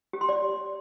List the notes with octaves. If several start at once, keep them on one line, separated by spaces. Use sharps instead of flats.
G4
C6
D5